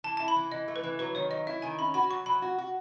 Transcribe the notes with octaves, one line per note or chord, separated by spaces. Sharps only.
E3 A5
E4 A5
B5
E3
E3 D#5
A3
B4
E3
F#3 B4
D#3 C#5
F#3 D#5
E4 E5
D#3 G#5
C#4 B5
F#4 B5
F#3 C#6
F#3 B5
F#4
F#4